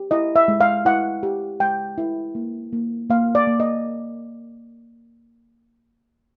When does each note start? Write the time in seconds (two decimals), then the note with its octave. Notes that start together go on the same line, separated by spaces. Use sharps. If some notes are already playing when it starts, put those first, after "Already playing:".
Already playing: G4
0.11 E4 D#5
0.36 E5
0.48 G#3
0.61 F5
0.85 E4 F#5
1.23 G4
1.60 G#3 G5
1.98 E4
2.35 A#3
2.73 A#3
3.10 A#3 F5
3.35 D5
3.47 A#3
3.60 D#5